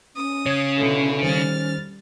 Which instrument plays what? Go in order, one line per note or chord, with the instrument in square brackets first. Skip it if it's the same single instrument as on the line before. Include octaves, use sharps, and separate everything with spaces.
[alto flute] C#4 [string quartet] D#6
[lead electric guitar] C#3 [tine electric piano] C#5 G#6
[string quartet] B2 D3 E4
[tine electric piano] D#3 C5 [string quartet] G3 F6 A6